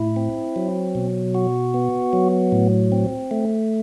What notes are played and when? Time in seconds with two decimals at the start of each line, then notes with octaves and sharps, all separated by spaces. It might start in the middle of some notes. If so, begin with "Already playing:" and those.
Already playing: A2 E4
0.16 C4
0.56 F#3
0.95 B2
1.35 F#4
1.74 B3
2.13 F#3
2.52 A2
2.92 C4
3.31 A3